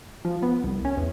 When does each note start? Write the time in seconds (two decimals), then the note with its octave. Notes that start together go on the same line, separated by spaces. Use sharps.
0.25 F3
0.42 B3
0.64 C2
0.85 C#4
0.97 E2